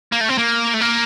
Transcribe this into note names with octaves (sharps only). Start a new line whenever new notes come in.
A#3
A3
C4
A#3
A3
A#3